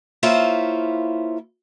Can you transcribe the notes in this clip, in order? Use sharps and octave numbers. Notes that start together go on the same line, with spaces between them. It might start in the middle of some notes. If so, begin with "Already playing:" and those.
A#3 E4 F4 C5 C#5 E5